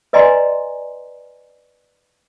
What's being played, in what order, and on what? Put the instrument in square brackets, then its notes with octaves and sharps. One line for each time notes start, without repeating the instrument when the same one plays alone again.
[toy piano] B4 D5 D#5 G#5 A#5 C6